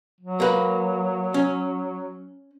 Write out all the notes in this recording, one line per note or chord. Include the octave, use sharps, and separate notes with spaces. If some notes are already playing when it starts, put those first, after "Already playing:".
F#3
A#3 B4
C#4